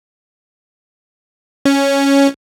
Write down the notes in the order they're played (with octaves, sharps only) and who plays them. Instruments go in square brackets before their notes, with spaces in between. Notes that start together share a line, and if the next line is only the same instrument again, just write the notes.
[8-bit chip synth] C#4